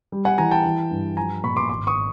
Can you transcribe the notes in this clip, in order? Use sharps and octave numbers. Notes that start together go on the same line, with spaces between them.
G3
F#5 G#5
E3 G#5 A#5
G5 A5
E3
G2
F3 G#5 A#5
A#2 B5 C#6
C6 D6
G#1 C6 D6
C#6 D#6